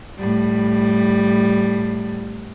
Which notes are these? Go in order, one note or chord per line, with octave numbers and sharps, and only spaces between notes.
A2 G3